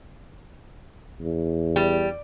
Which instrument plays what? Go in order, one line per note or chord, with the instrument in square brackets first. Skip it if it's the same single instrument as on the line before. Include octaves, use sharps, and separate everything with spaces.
[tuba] E2
[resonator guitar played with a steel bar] G3